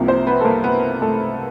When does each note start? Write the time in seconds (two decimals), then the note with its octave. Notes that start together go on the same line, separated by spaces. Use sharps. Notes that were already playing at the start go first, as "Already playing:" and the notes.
Already playing: C2 C3 F3 A#3
0.08 C4 C5
0.26 B3 B4
0.41 A4
0.45 A#3 A#4
0.64 B3 B4
1.02 A3 A4